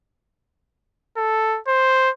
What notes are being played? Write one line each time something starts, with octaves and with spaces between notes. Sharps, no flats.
A4
C5